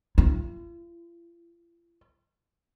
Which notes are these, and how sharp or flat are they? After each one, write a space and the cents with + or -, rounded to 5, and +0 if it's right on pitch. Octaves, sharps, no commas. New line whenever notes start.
F4 -45